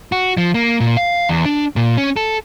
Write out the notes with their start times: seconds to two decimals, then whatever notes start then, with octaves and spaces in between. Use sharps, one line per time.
0.12 F#4
0.37 F3
0.54 A#3
0.80 A#2
0.97 F5
1.29 E2
1.45 D4
1.76 A#2
1.97 C#4
2.16 A4